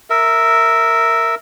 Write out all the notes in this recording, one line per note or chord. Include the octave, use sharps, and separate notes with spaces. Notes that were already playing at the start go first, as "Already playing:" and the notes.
A#4 E5